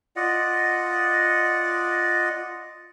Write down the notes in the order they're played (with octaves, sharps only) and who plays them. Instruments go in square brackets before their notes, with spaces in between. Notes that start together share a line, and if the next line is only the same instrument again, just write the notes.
[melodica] F4 D5 D#5 F#5